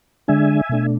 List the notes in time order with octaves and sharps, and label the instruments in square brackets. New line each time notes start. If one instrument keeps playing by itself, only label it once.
[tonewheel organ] D3 G#3 D4 E5 G#5
B2 A3 D4